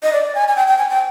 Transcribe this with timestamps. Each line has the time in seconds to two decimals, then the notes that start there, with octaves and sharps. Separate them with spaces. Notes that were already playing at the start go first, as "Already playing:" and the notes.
0.03 D#5
0.13 D5
0.35 G#5
0.48 G#5
0.56 G5
0.67 G5
0.78 G#5
0.90 G5